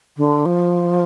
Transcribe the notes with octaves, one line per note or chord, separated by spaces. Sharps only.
D3
F3